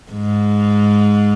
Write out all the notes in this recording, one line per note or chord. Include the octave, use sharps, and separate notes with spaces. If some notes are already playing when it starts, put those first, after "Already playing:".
G#2